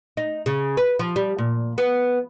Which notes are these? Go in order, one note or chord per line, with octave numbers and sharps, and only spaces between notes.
D#4
C#3
B4
F3
G3
A#2
B3